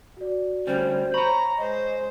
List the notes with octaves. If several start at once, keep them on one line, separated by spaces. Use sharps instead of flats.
F#4 D5
D2 G3 C#4 C5
C#5 A#5 B5 C#6
G#3 C5 D#5